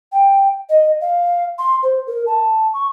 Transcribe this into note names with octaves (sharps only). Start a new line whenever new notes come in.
G5
D#5
F5
C6
C5
A#4
A5
C#6